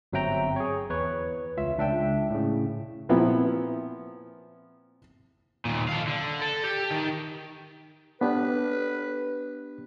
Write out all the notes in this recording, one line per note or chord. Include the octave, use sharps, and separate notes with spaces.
G1 F#3 C4 E5 G5 A#5
G#4 C#5
E2 B4 C#5
C#2 F4 E5
C#2 D4 E5 G5
A2 C#3
A#2 F3 B3 C4 E4
D#2 A#2
A4 F5
D3
A4
G4
D#3
B3 D4 G4 B4